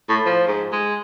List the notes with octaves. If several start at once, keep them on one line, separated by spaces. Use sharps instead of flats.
A2
F3
G#2
G#3